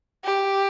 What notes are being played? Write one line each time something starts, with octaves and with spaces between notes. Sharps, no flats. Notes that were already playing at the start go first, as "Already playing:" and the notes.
G4